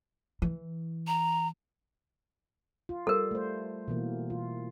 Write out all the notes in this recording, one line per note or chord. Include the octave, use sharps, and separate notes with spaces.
E3
A#5
F4
G3 A4 A#4
A3 C5
B2 E3 A#3
F4